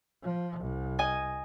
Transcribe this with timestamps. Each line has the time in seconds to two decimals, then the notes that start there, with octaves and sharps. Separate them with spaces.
0.23 F3
0.60 C2
0.99 D#5 G#5